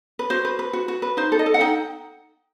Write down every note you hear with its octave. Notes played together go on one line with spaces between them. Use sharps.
B4
F#4 C5
B4
B4
F#4
F#4
B4
D#4 C5
A4
D#5
A4
F#5
D#4 G5